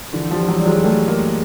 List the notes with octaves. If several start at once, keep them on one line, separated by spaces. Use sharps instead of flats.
D3 E3
F3 G3
E3 F#3
G3
F#3 G#3
G3 A3
G#3 A#3